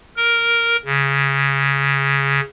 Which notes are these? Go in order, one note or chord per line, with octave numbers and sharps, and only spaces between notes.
A#4
C#3